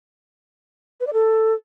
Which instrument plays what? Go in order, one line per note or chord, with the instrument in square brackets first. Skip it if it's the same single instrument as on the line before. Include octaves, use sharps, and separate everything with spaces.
[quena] B4
D5
A4